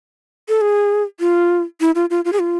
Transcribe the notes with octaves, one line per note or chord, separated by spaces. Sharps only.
A4
G#4
F4
E4
F4
F4
F4
G#4
F4